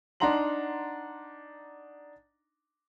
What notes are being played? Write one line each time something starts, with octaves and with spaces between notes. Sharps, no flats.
D4 D#4 F#5 A#5 C6 F#7